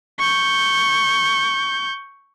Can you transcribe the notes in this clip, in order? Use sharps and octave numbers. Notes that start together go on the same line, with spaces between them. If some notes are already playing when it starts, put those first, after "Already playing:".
C#6 G6